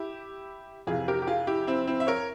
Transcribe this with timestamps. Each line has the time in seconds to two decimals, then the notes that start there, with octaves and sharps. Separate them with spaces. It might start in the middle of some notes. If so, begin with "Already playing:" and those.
Already playing: E4 G4
0.87 F2 C3 E3 F4 G#4
1.08 G4 A#4
1.22 G4
1.27 F4 G#4
1.47 E4 G4
1.67 C4 E4
1.87 C4 E4
2.00 E5
2.07 A#4 C#5